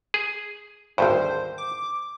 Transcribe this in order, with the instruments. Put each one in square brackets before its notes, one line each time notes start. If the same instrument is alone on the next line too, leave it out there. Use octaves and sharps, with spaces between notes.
[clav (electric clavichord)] G#4
[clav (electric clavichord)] G#1 D2 G2 [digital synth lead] C5
[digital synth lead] D6